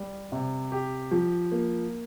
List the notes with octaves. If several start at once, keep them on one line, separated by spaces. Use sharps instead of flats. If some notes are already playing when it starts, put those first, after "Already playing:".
Already playing: G3
C3
G4
F3
A#3